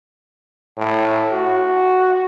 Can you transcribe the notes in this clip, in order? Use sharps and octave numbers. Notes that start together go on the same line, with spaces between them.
A2
F#4